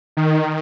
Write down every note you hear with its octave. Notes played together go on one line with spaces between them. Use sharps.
D#3